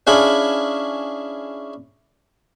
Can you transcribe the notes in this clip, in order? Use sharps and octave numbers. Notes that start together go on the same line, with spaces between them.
C#4 D4 E4 G#4 F5 B5